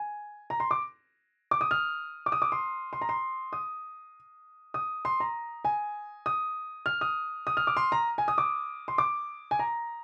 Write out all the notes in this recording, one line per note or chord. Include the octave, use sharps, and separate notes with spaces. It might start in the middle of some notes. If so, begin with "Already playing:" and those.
Already playing: G#5
A#5
C6
D6
D6
D#6
F6
D6
D#6
D6
C6
C6
A#5
C6
D#6
D#6
C6
A#5
G#5
D#6
F6
D#6
D#6
F6
D6
C6
A#5
G#5
D#6
D6
C6
D6
G#5
A#5